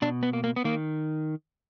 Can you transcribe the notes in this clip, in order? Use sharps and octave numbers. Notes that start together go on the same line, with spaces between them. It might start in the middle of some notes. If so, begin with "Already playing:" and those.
B2 D4
B3
A#3
A#3
B3
D#3 A#3